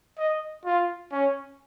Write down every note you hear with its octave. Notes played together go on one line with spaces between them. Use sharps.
D#5
F4
C#4